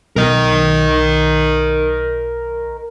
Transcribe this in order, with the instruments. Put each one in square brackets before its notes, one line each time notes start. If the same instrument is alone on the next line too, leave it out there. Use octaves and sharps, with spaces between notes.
[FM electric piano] B1 [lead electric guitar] A#4 D#5